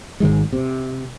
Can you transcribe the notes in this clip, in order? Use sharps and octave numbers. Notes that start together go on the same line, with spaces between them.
G#1 G#2 D#3 G#3
C3